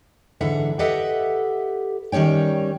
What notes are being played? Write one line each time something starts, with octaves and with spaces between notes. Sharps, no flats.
G#2 D3 E3 E5 F#5
G4 A4 B4 D#5 E5 F#5
D#3 G3 C#4 C#5 G5